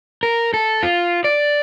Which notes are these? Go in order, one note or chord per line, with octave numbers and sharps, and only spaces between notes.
A#4
A4
F4
D5